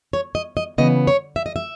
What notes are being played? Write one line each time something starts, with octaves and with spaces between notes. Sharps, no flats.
C#5
D#5
D#5
C#3 E3 B3 D#5
C#5
E5
D#5
E5